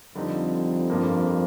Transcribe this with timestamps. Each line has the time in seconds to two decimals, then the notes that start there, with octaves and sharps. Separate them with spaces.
0.15 F2 D3 G3 C4 D#4
0.90 G2 F3 A#3